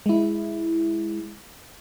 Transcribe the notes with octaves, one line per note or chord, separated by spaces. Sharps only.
G#3 E4